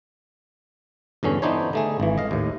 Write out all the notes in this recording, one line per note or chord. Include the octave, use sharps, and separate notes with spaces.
E2 G2 D3 C#4
E3 B3 D4 D#4 C5 C#5
D3 A3 G#4
G#1 E3
D#5 F5
D#2 A2